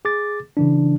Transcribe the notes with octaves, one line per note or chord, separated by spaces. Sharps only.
G#4 D6 A6
C#3 E3 D4